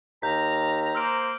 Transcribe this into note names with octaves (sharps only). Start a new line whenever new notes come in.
D#2 A#5 G6 B6
A#3 C5 E6 F6 D7